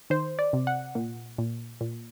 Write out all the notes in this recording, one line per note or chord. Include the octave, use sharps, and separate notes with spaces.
D#3 C5
D5
C3
F#5
A#2
A#2
A#2